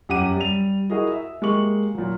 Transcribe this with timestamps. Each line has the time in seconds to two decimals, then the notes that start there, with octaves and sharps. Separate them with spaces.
0.09 F#2 G4 F#5 D6 D#7
0.36 G3 F7
0.90 E4 F#4 G#4 A#4 D#5
1.12 E5
1.42 G#3 A#3 G4 C#6 F#7
1.95 A#2 F#3